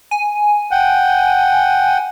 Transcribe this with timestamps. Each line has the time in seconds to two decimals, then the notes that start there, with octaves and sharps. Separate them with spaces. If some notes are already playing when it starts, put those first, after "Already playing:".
0.11 G#5
0.71 F#5 G5